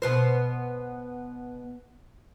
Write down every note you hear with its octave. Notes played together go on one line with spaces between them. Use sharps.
B2 B3 C5